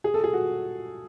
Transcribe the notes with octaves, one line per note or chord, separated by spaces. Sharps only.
G#4
A4
G#4
F#4